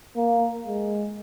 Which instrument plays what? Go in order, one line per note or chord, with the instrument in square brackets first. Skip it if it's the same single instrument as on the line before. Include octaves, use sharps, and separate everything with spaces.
[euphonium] A#3
G#3